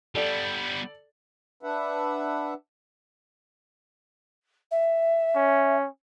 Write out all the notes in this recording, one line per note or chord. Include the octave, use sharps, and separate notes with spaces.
G3 B3 A4 D5
D4 B4 E5 F#5
E5
C#4